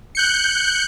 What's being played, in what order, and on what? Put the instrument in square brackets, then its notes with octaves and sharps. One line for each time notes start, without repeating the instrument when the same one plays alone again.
[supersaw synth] F#6 G6 C#7